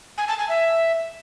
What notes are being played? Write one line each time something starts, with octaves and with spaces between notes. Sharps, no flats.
G#5
A5
G#5
E5